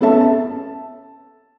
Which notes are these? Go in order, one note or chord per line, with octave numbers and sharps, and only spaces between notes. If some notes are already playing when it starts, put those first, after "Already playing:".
B3 C#4 A4 E5 A5
A5